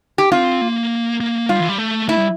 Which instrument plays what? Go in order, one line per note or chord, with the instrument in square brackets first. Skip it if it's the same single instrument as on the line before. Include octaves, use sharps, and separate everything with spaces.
[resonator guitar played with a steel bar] G4
[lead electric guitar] C4 [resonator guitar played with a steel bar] F4
[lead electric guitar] A#3
A#3
[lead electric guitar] G3 [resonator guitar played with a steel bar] F4
[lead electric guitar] E3
G3
A3
[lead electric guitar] A3 [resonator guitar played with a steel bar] E4
[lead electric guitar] G3